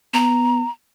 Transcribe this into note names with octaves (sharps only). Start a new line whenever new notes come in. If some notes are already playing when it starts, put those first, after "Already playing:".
B3 A#5